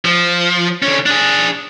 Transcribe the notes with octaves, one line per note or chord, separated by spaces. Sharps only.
F3
D3 C#4
D4 G#4